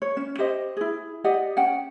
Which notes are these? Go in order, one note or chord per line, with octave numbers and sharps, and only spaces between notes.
C#5
C#4
G4 C5 D#5
E4 G#4
G4 D5 D#5 F#5
C#4 F#5 G5